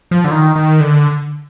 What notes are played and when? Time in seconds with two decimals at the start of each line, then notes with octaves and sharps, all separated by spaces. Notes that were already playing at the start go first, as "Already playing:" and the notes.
0.11 F3
0.24 D3
0.31 D#3
0.56 D#3
0.81 D3